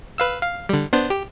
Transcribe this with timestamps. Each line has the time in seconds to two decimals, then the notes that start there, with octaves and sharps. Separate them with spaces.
0.18 B4 F5 E6
0.42 F5
0.69 D3 G3
0.93 B3 D4 C5
1.10 G4